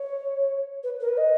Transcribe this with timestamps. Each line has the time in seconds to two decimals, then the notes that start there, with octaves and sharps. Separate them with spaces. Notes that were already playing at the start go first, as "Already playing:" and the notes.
Already playing: C#5
0.83 B4
1.00 A#4
1.08 B4
1.17 D#5